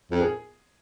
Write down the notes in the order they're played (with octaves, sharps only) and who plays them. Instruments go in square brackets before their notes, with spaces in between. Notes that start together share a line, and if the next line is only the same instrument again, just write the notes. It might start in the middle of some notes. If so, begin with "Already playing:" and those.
[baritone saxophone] F2
[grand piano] G#4